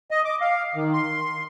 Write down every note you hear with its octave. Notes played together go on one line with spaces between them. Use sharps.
D#5
D6
F5
D#3
C6